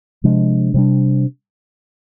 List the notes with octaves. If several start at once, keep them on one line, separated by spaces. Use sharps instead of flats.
C3 F3 G#3 D4
C3 G3 D4